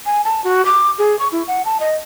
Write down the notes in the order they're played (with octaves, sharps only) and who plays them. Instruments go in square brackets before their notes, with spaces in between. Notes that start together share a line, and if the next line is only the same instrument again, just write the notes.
[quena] G#5
A5
F#4
D6
G#4
C#6
E4
F#5
A5
D#5